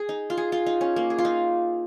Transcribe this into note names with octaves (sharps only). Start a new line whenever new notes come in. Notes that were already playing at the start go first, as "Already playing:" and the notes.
Already playing: G#4
D#4
F4
G#4
F4
D#4
C#4
A#3
G#4
F4
D#4